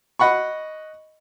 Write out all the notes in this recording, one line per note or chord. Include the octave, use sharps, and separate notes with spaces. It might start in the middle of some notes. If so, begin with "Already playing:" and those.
D#5 F#5 B5 C#6